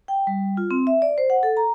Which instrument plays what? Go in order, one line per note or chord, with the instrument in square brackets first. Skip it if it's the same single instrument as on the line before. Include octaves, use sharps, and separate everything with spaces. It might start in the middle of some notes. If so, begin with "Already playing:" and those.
[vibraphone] G5
G3
F4
C4
E5
D5
C5
F#5
A4
A#5